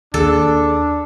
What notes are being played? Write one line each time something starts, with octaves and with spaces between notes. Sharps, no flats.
D#2 D4 A4